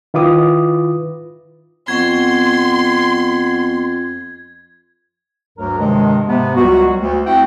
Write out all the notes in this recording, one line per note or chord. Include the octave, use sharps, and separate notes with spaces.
D#3 E4 F4 B4 D6 D#6
F2 B3 F#5 C6 C#6 G#6
D2 G2 F#3 A#4
G2 C3 D#3 F3 G#3
G#2 C3 B3
C#2 F#3 G3 F#4
D2
A3 C4 E4 F#4 F#5 G5